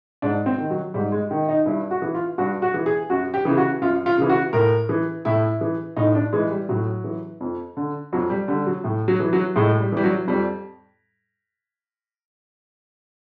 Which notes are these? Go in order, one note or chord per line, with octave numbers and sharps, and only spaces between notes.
G#2 D4
C4
D#3
F#3
G#2 G3
G#3
D#3
D#4
G2 E4
F#4
E3
F4
G2 F#4
F#4
E3
G#4
F#2 F#4
G4
C#3 E3
F#4
F#2 F4
F4
C#3 E3
F#4
A2 A#4
E3
A2 E4
E3
A2 D#4
D4
E3 G#3
G3
A2 F#3
E3
F2
D3
F2 F#3
G3
D3 G3
F#3
A2
F#3
E3
F#3
A2 G#3
G3
E3 G3
F#3
F2 G3